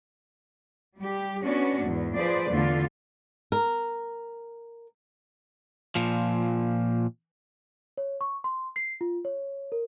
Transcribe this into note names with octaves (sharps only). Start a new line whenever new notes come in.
G3 G4
B3 C#4 D4 F#4
E2 G#2
F3 G#4 B4 C5 D5
E2 D3 A3 F4 D5
A#4
A#2 F3
C#5
C#6
C6
C7
F4
C#5
A#4